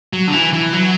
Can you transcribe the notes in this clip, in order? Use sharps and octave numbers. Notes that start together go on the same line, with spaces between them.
F#3
D3
E3
E3
F#3